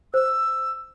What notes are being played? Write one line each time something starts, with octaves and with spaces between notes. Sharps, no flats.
C5 E6